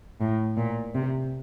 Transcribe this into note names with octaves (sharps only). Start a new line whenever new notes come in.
A2
A#2
C3